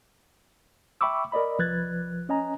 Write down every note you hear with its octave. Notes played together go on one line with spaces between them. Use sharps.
E5 G5 B5 C#6 D6 E6
A#4 D5 D#5 B5
C2 F3 B4 F#6 G#6 A6
C#4 D#5 G#5 A#5